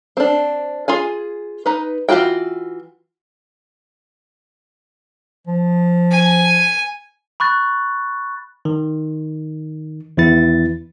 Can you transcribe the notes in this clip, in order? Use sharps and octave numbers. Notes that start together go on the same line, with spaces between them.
C4 D4
F4 G#4 G#5
D#4 B4
E3 D#4 F4 F#4 G5
F3
G#5
B5 C#6 F#6 A6
D#3
E2 D#3 E3 E4 A6